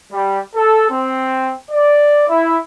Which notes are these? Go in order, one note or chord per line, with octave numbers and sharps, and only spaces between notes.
G3
A4
C4
D5
E4